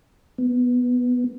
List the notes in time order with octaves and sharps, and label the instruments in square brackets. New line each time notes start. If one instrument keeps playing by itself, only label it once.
[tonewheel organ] B3